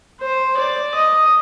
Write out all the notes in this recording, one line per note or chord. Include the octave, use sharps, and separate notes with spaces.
C5
D5
D#5